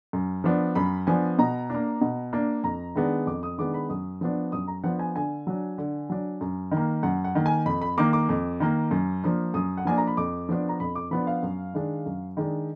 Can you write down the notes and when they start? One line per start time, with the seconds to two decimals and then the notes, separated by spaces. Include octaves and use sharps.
0.13 F#2
0.44 F3 B3 D4
0.75 F#2 B5
1.07 F3 B3 D4 G#5
1.38 B2 A#5
1.70 A#3 D4
2.01 B2
2.33 A#3 D4
2.64 F2 A#5
2.95 D#3 G#3 B3 D4
3.27 F2 D6
3.43 D#6
3.58 D#3 G#3 B3 D4 D6
3.74 B5
3.89 F#2 D#6
4.21 F3 B3 D4
4.52 F#2 D#6
4.68 A#5
4.84 F3 B3 D4 F#5
4.99 G#5
5.15 D3 G#5
5.47 F#3 D4
5.78 D3
6.10 F#3 D4
6.41 F#2
6.71 D#3
6.77 A#3
7.03 F#2 F#5
7.24 F#5
7.35 D#3 A#3
7.46 G#5
7.66 F2 B5
7.82 B5
7.98 D#3 A#3 D6
8.13 D6
8.29 F2
8.60 D#3 A#3
8.91 F#2
9.23 F3 A#3 D4
9.54 F#2 D#6
9.77 F#5
9.85 F3 A#3 D4 G#5
9.98 A#5
10.07 B5
10.17 F2 D6
10.49 F3 B3 D4
10.69 A#5
10.80 F2 B5
10.95 D6
11.11 F3 B3 D4 B5
11.27 F5
11.43 F#2
11.74 D#3 G#3 D4
12.06 F#2
12.37 D#3 G#3 D4